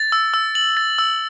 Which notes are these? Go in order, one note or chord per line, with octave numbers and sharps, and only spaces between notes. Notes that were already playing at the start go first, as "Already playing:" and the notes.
Already playing: A6
E6
E6
F#7
A6
E6